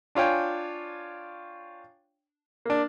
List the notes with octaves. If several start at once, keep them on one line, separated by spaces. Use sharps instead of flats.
D4 F4 C#5 G5 G#5
A#3 D4